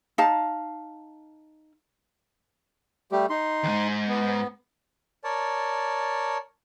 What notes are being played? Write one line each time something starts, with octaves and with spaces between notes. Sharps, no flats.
D#4 F5 A5
G3 A3 G4
D#4 C6
D#2 G#2
B3
A#4 C#5 D5 A5